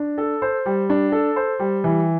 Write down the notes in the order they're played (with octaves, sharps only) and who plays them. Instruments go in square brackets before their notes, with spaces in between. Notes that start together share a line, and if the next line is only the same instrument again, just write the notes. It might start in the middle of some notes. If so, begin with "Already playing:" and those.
Already playing: [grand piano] D4
A4
C5
G3
D4
A4
C5
G3
E3